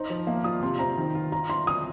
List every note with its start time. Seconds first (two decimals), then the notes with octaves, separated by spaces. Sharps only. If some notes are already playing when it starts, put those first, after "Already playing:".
Already playing: D#4 C5
0.10 F3
0.27 A#3 F5
0.44 F4 D#6
0.62 C3 C6
0.79 C4 A#5
0.97 D#3
1.15 F4
1.32 F4 A#5
1.50 F4 C6
1.67 F4 D#6